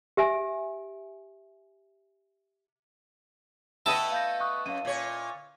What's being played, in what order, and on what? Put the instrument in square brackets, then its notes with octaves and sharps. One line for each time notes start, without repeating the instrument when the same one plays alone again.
[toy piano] G4 E5 G#5
[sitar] A3 B3 D#5 [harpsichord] E4 A5 [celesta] G5
[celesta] F5 G6 A#6
C#6 D#6 F#6
[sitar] F#2 [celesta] F5 D#7
[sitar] A#2 C#5